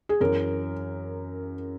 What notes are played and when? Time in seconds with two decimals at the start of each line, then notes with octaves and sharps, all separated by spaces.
0.09 G#4
0.21 F#2 E3 A#4